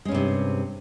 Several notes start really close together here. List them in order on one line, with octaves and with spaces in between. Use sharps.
G#3 C#4 G2 C3